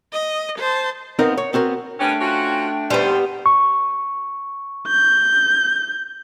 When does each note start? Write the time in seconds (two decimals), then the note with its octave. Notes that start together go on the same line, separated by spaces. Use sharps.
0.13 D#5
0.59 C5 A5
1.19 B3 C4 D#4 A#4 F5
1.37 C#5
1.53 B3 C4 F#4 A#4
1.99 G3 A3 B3 C#4 D4 G5
2.20 F3 C#4 F#4
2.90 D#2 G3 B3 C5
3.46 C#6
4.88 G6